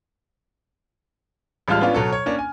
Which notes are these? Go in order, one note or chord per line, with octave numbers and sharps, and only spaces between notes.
A1 G3 G#3 F4 A5 F6
B3 C#4 D4 F4
B2 F#3 A4
C#5
A#3 C#4 D4
G#5